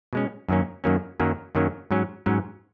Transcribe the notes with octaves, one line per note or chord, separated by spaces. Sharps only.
B2 G#3 C#4
F#2 D#3 F#3 A#3 C#4
F#2 D#3 F#3 A#3 C#4
F#2 D#3 F#3 A#3 C#4
F#2 D#3 F#3 A#3 C#4
G#2 F#3 C#4
G#2 F#3 C#4